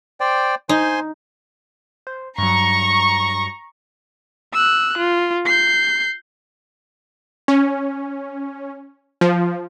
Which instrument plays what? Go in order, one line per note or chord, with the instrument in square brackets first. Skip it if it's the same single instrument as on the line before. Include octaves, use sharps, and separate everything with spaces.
[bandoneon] C5 D5 G5
[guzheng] D#4 [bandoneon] C5 G#5 C6
[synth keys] C5
[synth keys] G2 F#3 [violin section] A#5 C#6
[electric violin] E6 F#6
F4
G6 C7
[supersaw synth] C#4
F3